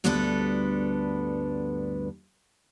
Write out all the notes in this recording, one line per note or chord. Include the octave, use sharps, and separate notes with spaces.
D2 G2 B3 D4 A4 B4